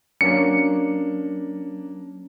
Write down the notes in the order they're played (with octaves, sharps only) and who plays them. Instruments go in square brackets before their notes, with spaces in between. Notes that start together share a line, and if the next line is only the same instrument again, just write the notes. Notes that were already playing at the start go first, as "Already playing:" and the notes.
[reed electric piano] F#3 C#4 [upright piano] A#3 D4 [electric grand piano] C#7